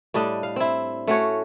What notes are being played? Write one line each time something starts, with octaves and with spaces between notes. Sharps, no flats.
A2 G3 D4 D#5
F5
C4 E4
A3 C#4 F#4 C#5